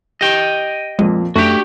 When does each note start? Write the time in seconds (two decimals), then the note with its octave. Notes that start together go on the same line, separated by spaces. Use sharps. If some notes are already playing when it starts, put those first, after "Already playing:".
0.21 G4 D#5 G5
0.99 F2 A#2 F3 G#3
1.36 F#2 A3 D4 F#4 G4 B6